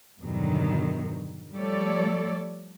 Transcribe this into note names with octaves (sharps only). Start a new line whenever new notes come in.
E2 G2 B2 D3 D#3 F#3
F3 G3 A3 A4 C#5 D5